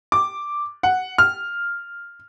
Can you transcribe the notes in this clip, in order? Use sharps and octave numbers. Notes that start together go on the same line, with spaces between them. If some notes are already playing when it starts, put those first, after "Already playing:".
D6
F#5
F6